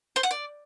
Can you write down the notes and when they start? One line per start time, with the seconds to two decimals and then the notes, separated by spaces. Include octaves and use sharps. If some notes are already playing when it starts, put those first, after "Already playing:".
0.16 C5
0.23 F#5
0.31 D5